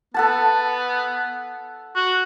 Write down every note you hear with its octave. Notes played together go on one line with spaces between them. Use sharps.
B3 A4 F#5 A5
F#4